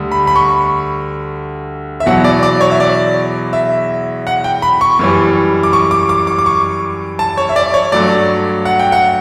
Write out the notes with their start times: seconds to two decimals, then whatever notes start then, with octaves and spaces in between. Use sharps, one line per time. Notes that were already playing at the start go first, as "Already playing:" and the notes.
Already playing: D2 D3 G3
0.12 B5
0.27 B5
0.36 C#6
2.00 E5
2.06 E2 B2 F#3 F#5
2.24 D5
2.43 D5
2.61 C#5
2.71 E5
2.80 D5
3.53 E5
4.27 F#5
4.44 G5
4.62 B5
4.81 C#6
4.99 F#2 E3 G3
5.63 D6
5.73 C#6
5.91 D6
6.09 D6
6.27 D6
6.38 D6
6.46 C#6
7.19 A5
7.37 C#5
7.49 E5
7.56 D5
7.74 C#5
7.92 G2 F#3 A3 D5
8.65 F#5
8.79 G5
8.92 F#5